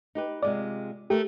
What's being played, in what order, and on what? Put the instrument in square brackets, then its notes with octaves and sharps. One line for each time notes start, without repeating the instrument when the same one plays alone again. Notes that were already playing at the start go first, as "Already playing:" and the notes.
[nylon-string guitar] D#4 G4 B4
[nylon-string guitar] C3 G#3 F4 [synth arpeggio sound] D5
[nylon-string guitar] A3 A#4 [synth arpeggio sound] G4